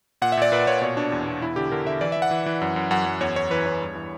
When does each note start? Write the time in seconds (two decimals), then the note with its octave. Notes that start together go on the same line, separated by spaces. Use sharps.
0.22 A#2 F#5
0.32 E5
0.37 A#2 D5
0.52 A#2 B4
0.67 A#2 C#5
0.82 B2 C#5
0.96 B2 D4
1.12 E2
1.27 B2
1.41 E2 E4
1.56 D3 G4
1.72 D3 A#4
1.86 D3 E5
2.01 E3 D5
2.12 E5
2.17 E3
2.22 F#5
2.31 E3
2.46 E3
2.62 F#2
2.76 F#2
2.91 F#2 F#5
3.06 F#2
3.21 E2 C#5
3.36 E2 C#5
3.51 E3 B4
3.66 E2 C#5
3.81 G2
3.95 E3